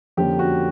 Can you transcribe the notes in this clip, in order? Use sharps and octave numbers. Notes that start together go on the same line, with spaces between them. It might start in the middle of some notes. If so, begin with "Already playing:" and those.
F2 D3 F3 A#3 C#4 G4
F#4